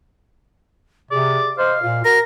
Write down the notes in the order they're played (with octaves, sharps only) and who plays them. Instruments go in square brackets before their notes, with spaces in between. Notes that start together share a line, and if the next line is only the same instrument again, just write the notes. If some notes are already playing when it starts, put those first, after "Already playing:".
[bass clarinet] C3 [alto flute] G#4 [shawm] D5
[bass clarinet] C5 [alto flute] D#5 [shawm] F5
[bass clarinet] A#2 [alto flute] F4
[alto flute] F#4 [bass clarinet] A#4 [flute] A#6